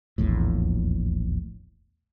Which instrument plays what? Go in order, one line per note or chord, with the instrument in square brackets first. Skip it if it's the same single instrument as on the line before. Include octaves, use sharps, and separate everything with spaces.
[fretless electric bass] D#1 A#1 E2 A2